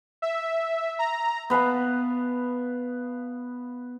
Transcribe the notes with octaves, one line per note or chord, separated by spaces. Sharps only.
E5
A#5
B3 B4 F5 A5